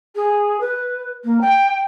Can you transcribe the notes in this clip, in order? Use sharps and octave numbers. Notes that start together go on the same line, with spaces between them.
G#4
B4
A#3
G5